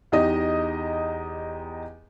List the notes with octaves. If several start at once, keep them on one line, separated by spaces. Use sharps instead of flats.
E2 D#4 G4 D#5